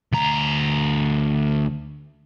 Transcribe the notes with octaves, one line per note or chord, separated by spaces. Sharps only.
D2 A#5